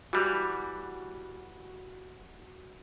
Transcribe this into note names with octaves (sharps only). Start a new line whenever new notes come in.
E3 G3 F#4